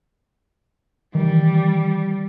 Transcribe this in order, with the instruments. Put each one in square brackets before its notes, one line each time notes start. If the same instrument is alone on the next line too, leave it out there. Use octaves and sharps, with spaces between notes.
[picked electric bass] D#3 E3 [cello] G3